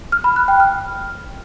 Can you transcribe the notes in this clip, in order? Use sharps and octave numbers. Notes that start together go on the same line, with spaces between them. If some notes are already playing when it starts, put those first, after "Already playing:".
F6
B5
F#6
G5
F6